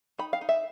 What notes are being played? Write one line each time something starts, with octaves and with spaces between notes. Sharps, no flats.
D#4 B5
F5
D#4
E5